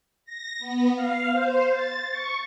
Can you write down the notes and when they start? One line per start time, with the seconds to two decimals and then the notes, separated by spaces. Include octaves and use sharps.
0.25 A#6
0.59 B3
0.94 F5
1.31 C5
1.73 A6
2.11 C#6